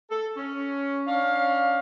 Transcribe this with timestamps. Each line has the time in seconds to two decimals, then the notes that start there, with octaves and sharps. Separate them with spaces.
0.11 A4
0.37 C#4
1.07 C#4 D4 F5